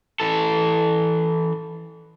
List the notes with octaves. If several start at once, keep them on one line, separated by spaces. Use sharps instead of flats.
E3 A4